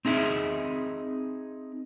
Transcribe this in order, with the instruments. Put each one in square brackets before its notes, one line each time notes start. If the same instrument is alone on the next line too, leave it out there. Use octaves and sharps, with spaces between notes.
[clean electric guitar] C4 D#4 G#4 E5